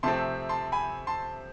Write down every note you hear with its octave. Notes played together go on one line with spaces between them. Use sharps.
C3 F3 A3 C4 A5 C6
A5 C6
G#5 B5
A5 C6